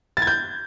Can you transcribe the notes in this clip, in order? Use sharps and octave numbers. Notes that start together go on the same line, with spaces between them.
A6
G#6
G6